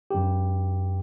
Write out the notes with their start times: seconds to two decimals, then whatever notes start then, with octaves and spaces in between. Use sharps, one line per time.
0.11 F#2 G4